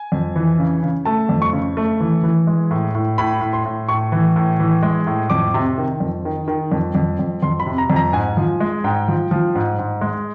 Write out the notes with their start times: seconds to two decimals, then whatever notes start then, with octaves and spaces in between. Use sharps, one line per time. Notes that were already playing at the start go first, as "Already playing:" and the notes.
Already playing: G#5
0.12 F2
0.36 E3
0.59 C#3
0.83 C#3
1.05 A3 A5
1.29 F2
1.42 C#6
1.53 C#3
1.77 A3
2.00 E3
2.23 E3
2.47 G#3
2.71 A2
2.95 A2
3.18 A2 B5
3.41 A2
3.53 C6
3.65 A2
3.89 A2 C#6
4.12 E3
4.36 A2
4.59 E3
4.83 G#3
5.07 A2
5.30 F2 D6
5.54 C3
5.78 D#3
6.00 F2
6.25 D#3
6.48 D#3
6.72 F2
6.95 F2
7.19 F2
7.42 F2 C6
7.60 B5
7.66 C3
7.78 A#5
7.90 F2
7.96 A#5
8.13 G#2 G#5
8.37 F3
8.61 G#3
8.84 G#2 G5
9.08 F3
9.31 F3
9.55 G#2
9.79 G#2
10.01 G#3